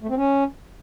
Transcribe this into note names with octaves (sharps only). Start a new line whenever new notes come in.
A3
C4
C#4